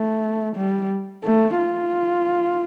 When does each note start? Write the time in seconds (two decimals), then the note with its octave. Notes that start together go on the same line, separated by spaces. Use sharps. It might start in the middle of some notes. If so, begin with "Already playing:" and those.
Already playing: A3
0.56 G3
1.24 A3
1.58 F4